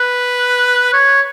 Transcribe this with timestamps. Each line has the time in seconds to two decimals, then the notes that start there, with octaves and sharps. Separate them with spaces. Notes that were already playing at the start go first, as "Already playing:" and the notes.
Already playing: B4
0.93 C#5